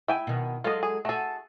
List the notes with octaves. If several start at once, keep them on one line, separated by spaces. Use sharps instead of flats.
E4 E5 G5 G#5
B2 D#3
F#3 G#3 F4 A4 D#5
G#4
A3 F#4 G#4 A4